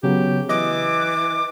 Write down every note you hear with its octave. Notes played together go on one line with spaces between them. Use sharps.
C#3 F#3 B3 G4
E3 D#5 D6